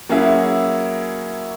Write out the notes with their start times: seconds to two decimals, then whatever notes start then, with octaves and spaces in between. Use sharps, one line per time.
0.09 F#3 A#3 C#4 E4 G#4 E5